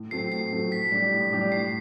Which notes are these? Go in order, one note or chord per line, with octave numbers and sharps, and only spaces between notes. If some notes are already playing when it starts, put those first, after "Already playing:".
Already playing: A2
F#3 A3 C4 C7
A2 C7
F#3 A3 C4
A2 B6
G3 D4 G4
A2
G3 D4 G4
A2 C7